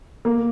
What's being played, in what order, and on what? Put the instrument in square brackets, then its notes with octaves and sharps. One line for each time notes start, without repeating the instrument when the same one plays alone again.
[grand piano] A#3